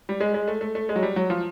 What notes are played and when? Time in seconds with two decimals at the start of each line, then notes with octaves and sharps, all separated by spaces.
0.09 G3
0.21 G#3
0.34 G#3
0.48 A3
0.61 A3
0.75 A3
0.89 G#3
0.96 F#3
1.03 G3
1.16 F#3
1.30 F3